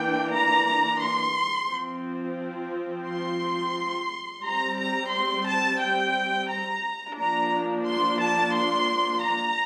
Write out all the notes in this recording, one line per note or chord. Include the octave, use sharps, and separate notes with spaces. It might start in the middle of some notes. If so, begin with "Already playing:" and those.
Already playing: E3 A#3 D4 G5
A#5
C6
F3 C4
C6
G3 C4 A#5
A#5
C6
A5
G5
A#5
F3 A#3 D4 A#5
C6
A5
C6
A#5